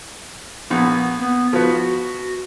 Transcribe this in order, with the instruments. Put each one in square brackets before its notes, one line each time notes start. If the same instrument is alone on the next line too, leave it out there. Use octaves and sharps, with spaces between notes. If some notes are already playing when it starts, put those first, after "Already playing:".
[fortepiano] A#1 [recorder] B3
[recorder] B3
[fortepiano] F3 B3 [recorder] F#4